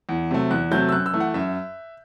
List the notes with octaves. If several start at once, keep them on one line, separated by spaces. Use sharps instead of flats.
E2
C3 F#3 A3
E2 F#6
C3 F#3 A3 G6
E6
F#2 F#6
E6
E3 A3
F#5
F#2 E5